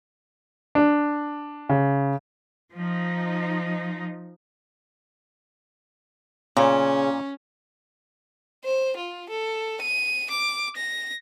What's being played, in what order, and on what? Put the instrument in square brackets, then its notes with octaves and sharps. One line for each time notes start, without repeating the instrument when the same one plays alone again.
[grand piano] D4
C#3
[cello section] F3 D#4
[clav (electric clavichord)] A#2 [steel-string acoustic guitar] C#3 [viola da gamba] C#4
[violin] C5
F4
A4
D#7
D6
A#6